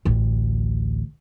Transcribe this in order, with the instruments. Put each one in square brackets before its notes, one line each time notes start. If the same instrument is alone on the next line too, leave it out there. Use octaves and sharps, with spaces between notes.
[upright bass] A1 D2